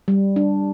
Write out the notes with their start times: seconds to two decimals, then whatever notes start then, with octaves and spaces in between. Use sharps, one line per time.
0.08 G3
0.36 D4